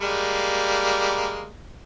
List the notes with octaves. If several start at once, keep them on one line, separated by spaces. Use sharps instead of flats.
G3 G#3 A#3